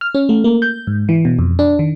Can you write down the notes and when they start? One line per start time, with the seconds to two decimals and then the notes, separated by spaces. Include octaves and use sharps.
0.01 F6
0.15 C#4
0.29 A3
0.44 A#3
0.62 G6
0.87 G#2
1.09 E3
1.25 B2
1.39 F2
1.59 D4
1.79 D#3